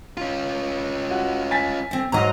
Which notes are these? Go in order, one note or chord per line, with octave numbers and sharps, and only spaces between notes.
C#4 F4
F#4
G#5 A6 B6
D3 C4
G#2 F#3 C5 D#5 A#5